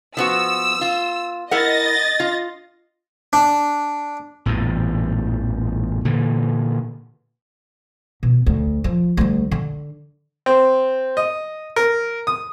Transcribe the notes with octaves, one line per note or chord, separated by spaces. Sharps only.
F3 B3 F#4 E6
F4
E4 A#4 D#5 F#5 A6 A#6
F4
D4
A1 E2 G2 A#2
A#2 D3 E3
B2
D2
F3
D2 G3
D3
C4
D#5
A#4
D#6